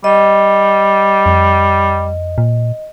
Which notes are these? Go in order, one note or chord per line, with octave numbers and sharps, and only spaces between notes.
G3 D#5
F2
A#2